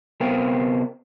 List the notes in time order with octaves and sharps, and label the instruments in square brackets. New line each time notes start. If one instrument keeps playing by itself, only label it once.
[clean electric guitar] C3 B3 A#4 C5 F5 G5